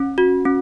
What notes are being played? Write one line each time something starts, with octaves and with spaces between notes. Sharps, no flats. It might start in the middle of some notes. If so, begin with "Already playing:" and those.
Already playing: C#4
F#4
C#4